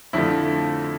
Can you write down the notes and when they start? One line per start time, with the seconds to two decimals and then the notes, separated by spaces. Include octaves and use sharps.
0.13 F2 D3 F3 A3 E4